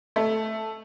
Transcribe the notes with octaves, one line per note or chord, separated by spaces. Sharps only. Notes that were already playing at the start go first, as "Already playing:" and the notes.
A3